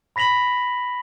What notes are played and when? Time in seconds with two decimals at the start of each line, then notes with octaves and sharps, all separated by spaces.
0.16 B5 A#6 B6 F7 F#7